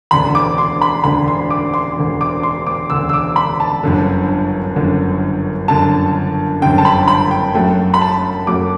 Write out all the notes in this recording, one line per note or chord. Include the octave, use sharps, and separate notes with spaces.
E1 D2 D3 B5
D6
C6
B5
E1 D2 D3 B5
C6
D6
C6
E1 D2 D3
D6
C6
D6
E1 D2 D3 E6
E6
D6
B5
A5
G1 F#2 D3
G1 F#2 D3
G1 F#2 D3 A5
G1 F#2 D3 G5
A5
B5
B5
G5
F#2 F#3 A3 G5
B5
A5
F#2 F#3 A3 D6